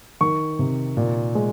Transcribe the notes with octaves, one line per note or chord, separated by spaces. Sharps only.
D#3 C#6
C3
A#2
G#3